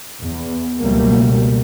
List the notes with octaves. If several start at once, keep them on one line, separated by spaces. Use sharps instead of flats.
E2
C#2 B2 F#3 G3 A3 A#3